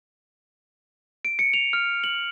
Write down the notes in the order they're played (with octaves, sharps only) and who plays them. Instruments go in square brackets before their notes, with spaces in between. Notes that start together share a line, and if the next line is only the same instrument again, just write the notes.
[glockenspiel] D7
C#7
F7
F6
F#7